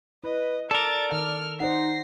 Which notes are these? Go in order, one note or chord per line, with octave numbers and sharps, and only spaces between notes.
E4 B4 D#5
A4 A#4 D5 A6 D7
D#3 F6
D#4 C5 D5 F#5 A#6 C7